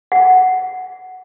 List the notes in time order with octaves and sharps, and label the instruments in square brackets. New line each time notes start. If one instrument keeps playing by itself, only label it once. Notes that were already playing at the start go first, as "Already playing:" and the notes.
[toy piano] F#5